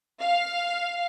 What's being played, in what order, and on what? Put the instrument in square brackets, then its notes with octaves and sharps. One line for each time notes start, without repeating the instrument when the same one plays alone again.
[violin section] F5